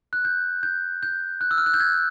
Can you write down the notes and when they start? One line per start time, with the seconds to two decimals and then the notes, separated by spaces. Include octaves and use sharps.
0.13 F#6
0.25 G6
0.63 G6
1.03 G6
1.41 F#6
1.51 E6
1.58 F6
1.66 F#6
1.74 G6
1.80 G#6